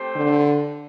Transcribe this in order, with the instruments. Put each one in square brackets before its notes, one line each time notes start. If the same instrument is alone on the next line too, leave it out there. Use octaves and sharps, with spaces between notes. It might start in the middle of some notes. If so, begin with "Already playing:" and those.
Already playing: [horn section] A3 C4 G4 C5
[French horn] D3